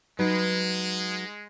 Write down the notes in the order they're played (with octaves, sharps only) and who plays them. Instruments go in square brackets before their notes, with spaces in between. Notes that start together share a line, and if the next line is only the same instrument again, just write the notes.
[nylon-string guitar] F#3 D#4 B4 [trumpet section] G#3